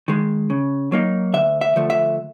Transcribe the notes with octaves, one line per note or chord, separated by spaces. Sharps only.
D#3 G#3
C#3
F#3 A#3 D#4
D2 E5
E5
D3 F3 A3
E5